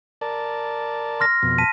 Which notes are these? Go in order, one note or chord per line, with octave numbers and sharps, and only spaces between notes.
A#4 D5 A5
C6 F6 A#6
F2 B2
A5 B6 D#7